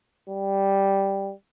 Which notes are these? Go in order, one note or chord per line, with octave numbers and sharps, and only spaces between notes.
G3